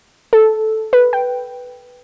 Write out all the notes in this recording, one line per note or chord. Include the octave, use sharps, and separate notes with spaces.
A4
B4
G5